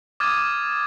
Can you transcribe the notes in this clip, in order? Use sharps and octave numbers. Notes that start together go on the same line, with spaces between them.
D6 D#6 F6 G#6 A6 D#7